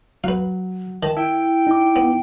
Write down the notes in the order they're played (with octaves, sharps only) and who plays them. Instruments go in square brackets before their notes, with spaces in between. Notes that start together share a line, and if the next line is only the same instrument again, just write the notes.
[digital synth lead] F#3 [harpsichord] B4 F5
[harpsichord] D#3 [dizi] A5
[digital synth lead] E4 [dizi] G5
[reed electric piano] D#4 D6
[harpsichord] B3